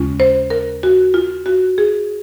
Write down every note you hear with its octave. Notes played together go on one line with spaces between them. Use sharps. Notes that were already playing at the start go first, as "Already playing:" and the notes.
Already playing: D#2 C#3 G#3 C#4 F4
C5
A#4
F#4
F4
F#4
G#4